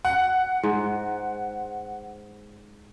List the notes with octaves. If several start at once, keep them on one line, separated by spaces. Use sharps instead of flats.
F#5
G#2